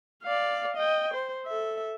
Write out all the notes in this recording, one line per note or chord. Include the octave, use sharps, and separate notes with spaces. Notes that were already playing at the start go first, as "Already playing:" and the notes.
D5 F5
D#5 G5
C5
A4 E5